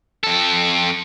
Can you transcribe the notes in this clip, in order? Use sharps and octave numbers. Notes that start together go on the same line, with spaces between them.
F2 A4